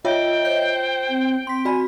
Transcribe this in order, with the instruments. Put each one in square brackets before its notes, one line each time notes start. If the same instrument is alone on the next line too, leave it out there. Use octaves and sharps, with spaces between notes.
[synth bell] F4 C#5 E5 [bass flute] D#5 [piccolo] G5
[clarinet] C5 [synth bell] G6
[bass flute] C4
[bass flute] C4 [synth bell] C6 B6
[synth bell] F#4 D5 B5 [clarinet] G#5